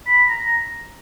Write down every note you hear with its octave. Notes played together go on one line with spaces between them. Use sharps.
B5
A#5